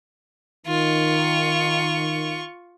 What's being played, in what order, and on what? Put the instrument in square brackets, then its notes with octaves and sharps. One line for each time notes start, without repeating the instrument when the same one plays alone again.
[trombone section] D#3 [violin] F4 C#6